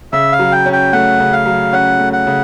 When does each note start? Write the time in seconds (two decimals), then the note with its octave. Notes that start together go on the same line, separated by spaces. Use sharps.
0.13 C#3 E5
0.32 F5
0.39 F#3
0.52 G5
0.66 C#4
0.73 G5
0.93 A3 F#5
1.20 C#3
1.33 F5
1.46 F#3
1.73 C#4 F#5
2.00 A3
2.13 F#5
2.27 C#3